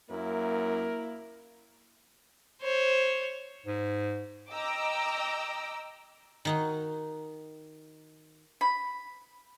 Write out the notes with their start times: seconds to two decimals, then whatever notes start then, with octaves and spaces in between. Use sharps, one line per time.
0.10 F#2 A#3 E4 A#4
2.62 C5 C#5
3.66 G#2
4.52 D#5 G5 A#5 D6 E6
6.45 D#3 D#4 F#4
8.61 B5